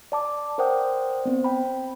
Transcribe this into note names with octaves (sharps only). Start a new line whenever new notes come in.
D5 A5 D6
A#4 C5 D5 F#5 G5 D#6
B3 C4 C5
G5 B5